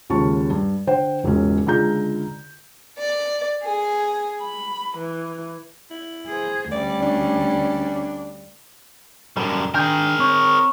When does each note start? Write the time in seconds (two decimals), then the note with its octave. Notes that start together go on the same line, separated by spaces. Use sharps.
0.10 G#1 D#2 C#3 F4 A5 C#6
0.50 G2
0.87 D3 C5 F#5 G5
1.24 E1 C#2 G#2 C#4
1.66 C#2 D3 F4 G#4 A#5 G6
2.99 D5
3.63 G#4
4.42 B5
4.98 E3
5.91 E4
6.28 G#4 C5
6.71 D2 G3 C#4 D5
7.02 D4
9.37 F#2 G3 A4 D5
9.74 D#3 D4 G#4 A#4 G5
10.19 C4 C#5